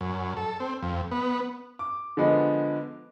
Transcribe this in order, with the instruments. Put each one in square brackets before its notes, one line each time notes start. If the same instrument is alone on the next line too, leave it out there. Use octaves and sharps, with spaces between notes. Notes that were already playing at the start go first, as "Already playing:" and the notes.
[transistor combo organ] F#2
A4
C4
F2
B3
[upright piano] D6
D3 F3 G#3 B3